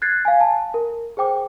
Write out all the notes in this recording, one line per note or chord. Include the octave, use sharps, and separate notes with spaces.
F#6 G#6 A6 C7
F5 G#5
A5
A#4
G#4 C5 G5 D6